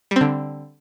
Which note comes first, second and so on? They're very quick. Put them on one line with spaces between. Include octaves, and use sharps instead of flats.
G3 C4 D3